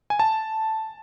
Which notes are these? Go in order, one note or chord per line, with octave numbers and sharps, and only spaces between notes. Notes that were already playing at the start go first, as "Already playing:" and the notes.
G#5
A5